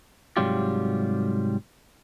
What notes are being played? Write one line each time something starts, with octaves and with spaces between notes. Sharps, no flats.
G#2 C3 F#3 G3 F4 G4